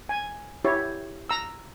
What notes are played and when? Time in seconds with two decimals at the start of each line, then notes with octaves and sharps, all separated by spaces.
0.09 G#5
0.64 E4 G4 C#5
1.29 A#5 E6